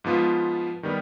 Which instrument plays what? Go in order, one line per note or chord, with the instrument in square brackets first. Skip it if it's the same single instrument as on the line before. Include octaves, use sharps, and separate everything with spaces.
[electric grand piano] G#2 F3 B3 F4
D#3 G3 B3